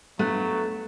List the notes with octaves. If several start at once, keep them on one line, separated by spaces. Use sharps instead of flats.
G2 F#3 A3 B3 F#6